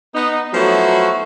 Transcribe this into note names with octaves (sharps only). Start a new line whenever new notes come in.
B3 D#4
F3 F#3 A3 B3 E4 F#4